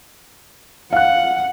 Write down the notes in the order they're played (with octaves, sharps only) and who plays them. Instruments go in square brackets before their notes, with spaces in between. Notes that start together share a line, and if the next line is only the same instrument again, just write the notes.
[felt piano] F5 F#6 [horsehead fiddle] F#5